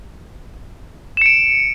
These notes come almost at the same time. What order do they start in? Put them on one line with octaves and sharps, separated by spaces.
E7 C#7 D7